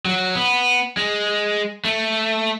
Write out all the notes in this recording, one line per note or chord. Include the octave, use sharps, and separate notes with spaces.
F#3
B3
G#3
A3